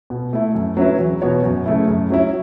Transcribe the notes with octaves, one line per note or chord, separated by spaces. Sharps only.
B2
A3 E4
F#2
F#3 C#4 E4 B4
E2
B2 B3 F#4 C#5
F#2
C#3 A3 E4
F#2
F#3 C#4 E4